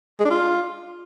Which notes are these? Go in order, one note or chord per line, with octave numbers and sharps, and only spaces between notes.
G#3
D4
F4